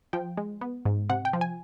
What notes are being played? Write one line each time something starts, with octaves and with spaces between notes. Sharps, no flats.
F3 G5
G#3
B3
G#2
C3 F#5
G5
F3
G#5